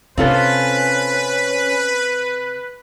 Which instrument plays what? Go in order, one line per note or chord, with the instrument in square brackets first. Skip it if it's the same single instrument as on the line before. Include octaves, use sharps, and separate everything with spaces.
[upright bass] C3 [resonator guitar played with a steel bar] C4 F4 A4 [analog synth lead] C#4 [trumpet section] B4